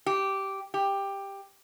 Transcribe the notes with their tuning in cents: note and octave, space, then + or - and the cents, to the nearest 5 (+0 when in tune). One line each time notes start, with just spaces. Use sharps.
G4 -10
G4 +10